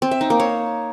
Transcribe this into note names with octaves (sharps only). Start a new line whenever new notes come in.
C4
E5
D#4
A#3
C#5